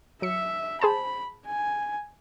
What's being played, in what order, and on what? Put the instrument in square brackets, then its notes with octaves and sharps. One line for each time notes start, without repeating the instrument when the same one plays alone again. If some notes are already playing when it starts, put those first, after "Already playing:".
[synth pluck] F#3 C#7 [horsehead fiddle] E5
[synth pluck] G#4 C5 A5 [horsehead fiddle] B5
[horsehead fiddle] G#5